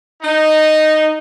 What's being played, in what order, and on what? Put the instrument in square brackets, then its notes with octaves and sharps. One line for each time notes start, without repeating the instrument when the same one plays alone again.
[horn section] D#4